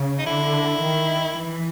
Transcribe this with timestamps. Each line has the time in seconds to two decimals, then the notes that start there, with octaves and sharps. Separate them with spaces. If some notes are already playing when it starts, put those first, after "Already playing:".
Already playing: C#3
0.19 D#4
0.26 D3 E4
0.82 D#3
1.38 E3